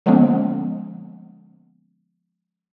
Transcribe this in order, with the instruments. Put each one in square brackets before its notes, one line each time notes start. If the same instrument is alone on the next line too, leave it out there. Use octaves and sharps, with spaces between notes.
[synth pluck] D3 F3 G#3 A#3 B3 C#4